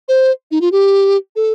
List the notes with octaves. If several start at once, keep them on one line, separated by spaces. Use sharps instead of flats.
C5
D#4
F4
G4
A4